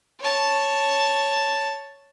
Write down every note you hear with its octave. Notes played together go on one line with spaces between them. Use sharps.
C#5 A5